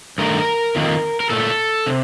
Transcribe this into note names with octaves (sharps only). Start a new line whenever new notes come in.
G2 D#3 A3 A#4
F2 D#3 A#3
A#4
A#2 A3 A4
C3